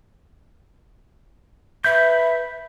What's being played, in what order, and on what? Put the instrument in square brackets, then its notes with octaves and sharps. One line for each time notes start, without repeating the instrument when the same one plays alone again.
[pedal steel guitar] B4 G6 [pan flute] E5